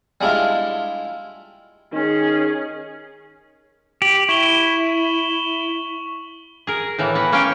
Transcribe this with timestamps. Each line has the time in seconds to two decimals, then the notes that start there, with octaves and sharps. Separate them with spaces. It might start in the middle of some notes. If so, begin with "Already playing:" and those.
0.21 G3 G#3 D4 E4 F4
1.93 D#3 C#4 G#4
4.02 G4 F#7
4.29 E4 C#6 E7 G7
6.67 G#4 A#4
6.98 A2 E3 A#3
7.15 B3 F#5
7.32 A#3 C#4 F5 G5